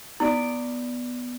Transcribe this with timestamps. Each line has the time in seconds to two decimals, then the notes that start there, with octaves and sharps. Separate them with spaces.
0.20 B3 E4 D5 D6